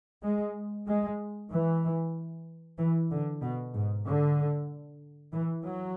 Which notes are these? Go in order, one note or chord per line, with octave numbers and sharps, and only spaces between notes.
G#3
G#3
E3
E3
D3
B2
G#2
D3
E3
F#3